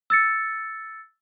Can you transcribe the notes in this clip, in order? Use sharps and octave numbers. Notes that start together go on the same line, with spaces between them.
E6 A6 C#7